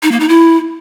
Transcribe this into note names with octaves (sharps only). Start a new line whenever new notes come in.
D#4
A#3
D#4
E4